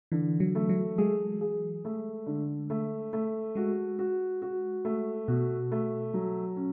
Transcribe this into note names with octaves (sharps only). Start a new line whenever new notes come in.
D3 E3
F#3
A3
F#3
G#3 G#4
G#4
A3
D3
A3
A3
G#3 F#4
F#4
F#4
A3
B2 F#4
A3
F#3
C#4